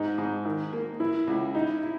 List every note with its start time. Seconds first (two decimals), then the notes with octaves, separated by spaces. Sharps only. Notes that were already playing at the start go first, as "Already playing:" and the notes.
Already playing: G#2 D#4
0.18 G#2
0.45 D#3
0.73 A#3
1.00 E3 E4
1.27 C#2
1.54 D#4 E4
1.82 E4